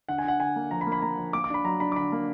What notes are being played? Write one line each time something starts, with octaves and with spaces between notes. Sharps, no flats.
D3 F#5
G#5
D3 F#5
D3 G#5
A#3
F3 A#5
B5
A#3
B5
A#3 A#5
F3
A#3 D6
D6
D4 B5
F#3 A#5
D4 B5
D6
D3 B5
A#3